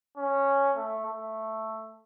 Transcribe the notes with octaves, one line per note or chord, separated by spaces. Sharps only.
C#4
A3
A3